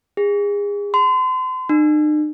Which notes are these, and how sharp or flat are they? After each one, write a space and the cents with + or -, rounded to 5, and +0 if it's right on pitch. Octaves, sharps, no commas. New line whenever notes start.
G#4 -30
C6 -35
D#4 -45